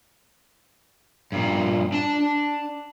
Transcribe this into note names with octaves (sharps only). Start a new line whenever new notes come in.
G2 A#2
D4 A5